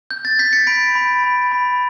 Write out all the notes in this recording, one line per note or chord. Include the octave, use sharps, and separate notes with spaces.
G6
A6
G6 B6
A6 C#7
B5 B6 D7
B5
B5
B5